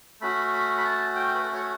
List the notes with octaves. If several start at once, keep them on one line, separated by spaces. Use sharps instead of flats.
A3 C#4 F#4 B5
B5
B5
A5
G5
B4
A4
C#5